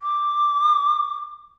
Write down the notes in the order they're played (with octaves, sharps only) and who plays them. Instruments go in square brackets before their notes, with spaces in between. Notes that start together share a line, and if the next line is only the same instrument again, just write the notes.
[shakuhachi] D6